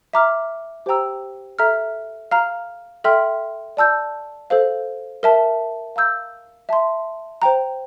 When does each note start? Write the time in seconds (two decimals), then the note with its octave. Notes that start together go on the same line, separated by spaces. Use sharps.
0.13 E5 A#5 D6 F6
0.86 G4 C5 G5 A#5 E6
1.59 A4 E5 A#5 F6
2.31 F5 A#5 F6
3.04 A4 E5 G5 C6 F6
3.77 D5 A5 E6 G6
4.50 A4 C5 F5
5.23 A#4 E5 A5
5.96 F5 A#5 E6 G6
6.69 E5 A5 C6
7.42 C5 G5 A#5